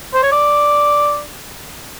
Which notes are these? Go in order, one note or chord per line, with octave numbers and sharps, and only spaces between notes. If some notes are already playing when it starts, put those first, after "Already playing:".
C5
C#5
D5